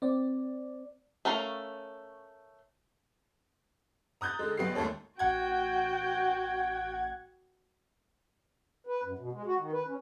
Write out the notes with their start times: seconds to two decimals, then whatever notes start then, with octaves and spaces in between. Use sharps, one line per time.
0.02 C4 D5
1.25 A3 C#4 A#4 F5
4.21 A#5 D#6 F#6 G6 A6
4.39 D3 G#3
4.57 B1 B3 G4 C7
4.75 D#2 G#2 A3 A4 C#5
5.19 A1 F#4 F#5 G5 G#6
8.86 B4
9.04 F#2
9.19 B2
9.32 G#3
9.46 F#4
9.58 D#3
9.72 B4
9.87 C#4